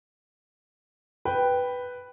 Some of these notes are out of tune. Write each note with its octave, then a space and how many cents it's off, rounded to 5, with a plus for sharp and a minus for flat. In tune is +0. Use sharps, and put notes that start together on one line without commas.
B4 +0 G5 +0